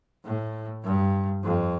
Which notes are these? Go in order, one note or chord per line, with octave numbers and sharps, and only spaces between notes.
A2
G2
F2